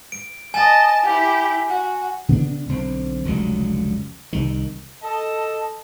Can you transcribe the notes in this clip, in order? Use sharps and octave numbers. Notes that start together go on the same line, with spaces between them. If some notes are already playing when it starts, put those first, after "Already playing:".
D7
D#5 G#5 A5
E4 G4
F#4
C#3 B3 D4
B1 D3 C4
F1 C#2 D3 F#3
C2 D#3
A4 D#5 A5